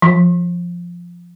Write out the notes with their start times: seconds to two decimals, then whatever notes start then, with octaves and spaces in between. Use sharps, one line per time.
0.02 F3